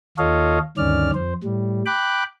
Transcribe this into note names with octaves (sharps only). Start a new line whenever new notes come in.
D#2 F4 A4 C#5 D#5 F5
D2 G2 D#3 C#4 D5 F6
F2 C5
A2 G3
G5 B5 D6 F#6